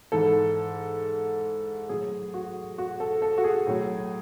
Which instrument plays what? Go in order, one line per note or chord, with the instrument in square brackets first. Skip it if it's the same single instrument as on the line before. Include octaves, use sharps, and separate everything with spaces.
[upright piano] G#2 E3 A4
A2 F#3 G#4
F#4
F#4
A4
A4
F#4
G#4
A2 F#3